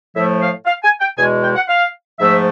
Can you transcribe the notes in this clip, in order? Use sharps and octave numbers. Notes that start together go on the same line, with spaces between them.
A2 F3 A3 E5
F5
F5
G#5
G5
E2 B2 G#3 G#5
G5
F#5
F5
G#2 F3 A3 E5